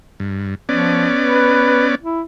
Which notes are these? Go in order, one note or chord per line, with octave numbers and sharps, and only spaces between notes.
G2
F3 B3 C#4 D5
B4
E4